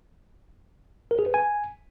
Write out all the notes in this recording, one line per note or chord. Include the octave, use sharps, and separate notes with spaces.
A#4
G#4
B4
G#5